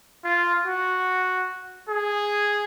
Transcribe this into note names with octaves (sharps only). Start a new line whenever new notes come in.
F4
F#4
G#4